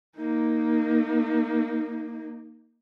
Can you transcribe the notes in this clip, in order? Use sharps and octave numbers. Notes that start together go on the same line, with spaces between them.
A#3 D#4